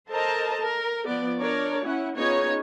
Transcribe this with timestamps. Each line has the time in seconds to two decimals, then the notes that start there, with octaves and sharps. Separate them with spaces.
0.11 A4 A#4 C5 D#5 A5 A#5
0.61 A#4
1.05 F3 B3 D5
1.39 D4 A#4 C#5 D5
1.84 C#4 E4 F#5
2.16 B3 C#4 D#4 F4 G#4 C#5